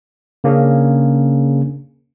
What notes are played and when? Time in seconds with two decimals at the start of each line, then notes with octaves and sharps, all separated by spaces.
0.44 C#3 A#3 C#4 D4 G#4